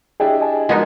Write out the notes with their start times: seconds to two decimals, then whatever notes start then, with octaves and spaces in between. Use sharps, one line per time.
0.20 D4 E4 G4 G#4 D#5 G5
0.40 D#5 G#5 A5
0.69 F3 G#3 B3 D#4 F#4 A#4